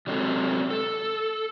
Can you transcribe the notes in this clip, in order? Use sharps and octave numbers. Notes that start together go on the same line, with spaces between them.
C3 F#3 G#3 C4 A4
A4